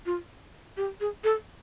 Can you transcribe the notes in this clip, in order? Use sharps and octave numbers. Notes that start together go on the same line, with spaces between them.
F4
G4
G#4
A4